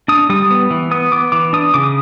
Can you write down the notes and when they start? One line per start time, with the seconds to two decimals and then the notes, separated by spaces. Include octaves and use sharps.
0.08 D4 D#6
0.30 G3 D#6
0.51 B3
0.70 E3
0.91 B3 D#6
1.12 B3 D6
1.32 E3 D6
1.53 D4 D#6
1.74 C#3 D6
1.83 D#6